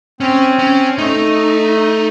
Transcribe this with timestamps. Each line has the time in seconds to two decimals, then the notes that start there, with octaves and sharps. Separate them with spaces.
0.21 C4 C#4
0.59 C#4
0.98 A3 D#4